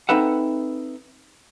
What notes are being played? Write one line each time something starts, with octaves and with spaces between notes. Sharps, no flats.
C4 D#4 A4 B4 E5 F#5